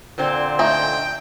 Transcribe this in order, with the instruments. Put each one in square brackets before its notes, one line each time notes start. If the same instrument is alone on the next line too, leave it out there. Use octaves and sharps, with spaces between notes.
[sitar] A#2 D3 C4
[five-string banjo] A3 D#4 [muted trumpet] G5